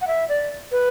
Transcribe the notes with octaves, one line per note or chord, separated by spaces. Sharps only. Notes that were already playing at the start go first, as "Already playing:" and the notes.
F#5
E5
D5
B4